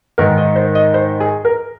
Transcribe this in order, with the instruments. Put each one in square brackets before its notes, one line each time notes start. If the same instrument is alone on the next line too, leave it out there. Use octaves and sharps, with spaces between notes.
[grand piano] G#2 D#3 A#4
D#5
C5
D#5
C5
G#4
A#4